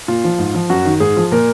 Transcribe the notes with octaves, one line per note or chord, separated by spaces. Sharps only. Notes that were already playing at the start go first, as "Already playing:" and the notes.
A#2 F4
F3
G#2
F3
F#2 F#4
D#3
G#2 G#4
F3
A#2 A#4